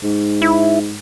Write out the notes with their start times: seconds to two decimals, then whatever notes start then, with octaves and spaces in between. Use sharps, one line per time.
0.03 G#2
0.42 E4